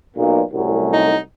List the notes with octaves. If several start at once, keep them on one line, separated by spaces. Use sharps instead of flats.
B1 A#2 A#3
C2 F#2 A2
D#4